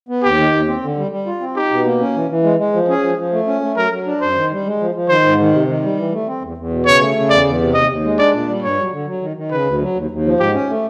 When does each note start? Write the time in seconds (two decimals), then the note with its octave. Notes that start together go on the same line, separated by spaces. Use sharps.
0.09 B3
0.23 D#2 G4
0.38 D#3
0.53 D#2
0.67 C4
0.83 D3
0.97 G3
1.11 G3
1.26 F4
1.40 C4
1.56 D#4 G4
1.71 B2
1.85 A#3
2.00 C#4
2.15 E3
2.29 E3
2.43 G#3
2.58 G#3
2.73 F3
2.88 C#4 G#4
3.03 F3
3.18 F3
3.33 A3
3.47 C#4
3.62 A3
3.77 F#3 A#4
3.91 F#3
4.06 D4
4.21 F#2 C5
4.35 D#3
4.51 G3
4.66 G#3
4.80 F3
4.95 F3
5.09 D#3 C5
5.24 G#2
5.39 D#3
5.53 C3
5.68 D#3
5.82 G3
5.97 E3
6.12 A3
6.27 C4
6.42 E2
6.57 E2
6.71 B2
6.85 C#3 C#5
7.00 A3
7.16 C#3
7.30 E2 D5
7.45 E2
7.60 C3
7.74 D#2 D#5
7.89 D#2
8.04 G#3
8.18 D4 D5
8.33 A#2
8.48 G3
8.63 G2 C#5
8.78 F#3
8.92 D3
9.07 F#3
9.22 D#3
9.37 D#3
9.51 C#3 B4
9.67 D2
9.81 F#3
9.95 D#2
10.11 D#2
10.25 F3
10.39 G#2 G4
10.54 C#4
10.69 A3